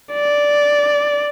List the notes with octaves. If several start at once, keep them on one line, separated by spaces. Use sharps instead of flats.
D5